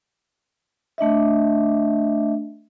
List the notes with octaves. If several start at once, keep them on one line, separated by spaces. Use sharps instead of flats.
A3 D4 D#5 E5